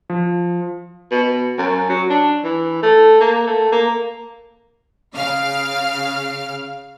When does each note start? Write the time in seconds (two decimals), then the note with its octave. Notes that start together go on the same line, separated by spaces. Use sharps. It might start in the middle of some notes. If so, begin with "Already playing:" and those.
0.10 F3
1.11 B2
1.58 F#2
1.89 F#3
2.10 D4
2.44 E3
2.83 A3
3.21 A#3
3.47 A3
3.72 A#3
5.15 C#3 F5 F6